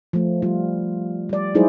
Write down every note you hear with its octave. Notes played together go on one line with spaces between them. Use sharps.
F3 A3
F3 G3 F4
G3 D5
F#3 G#3 D#4 E4 G#4 C5